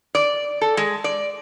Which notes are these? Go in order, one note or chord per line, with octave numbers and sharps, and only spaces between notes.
D5
A4
G#3
D5